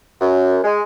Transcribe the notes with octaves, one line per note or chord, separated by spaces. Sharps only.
F#2
G#3